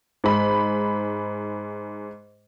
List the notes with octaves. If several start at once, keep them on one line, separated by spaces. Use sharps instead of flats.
G#2 B5